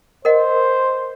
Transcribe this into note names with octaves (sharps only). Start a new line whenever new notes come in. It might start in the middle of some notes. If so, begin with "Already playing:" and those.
A#4 C5 D#5 F#5